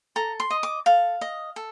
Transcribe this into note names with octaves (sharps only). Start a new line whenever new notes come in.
A4 A#5
C6
D#5
D6
A4 F5
D#5
A4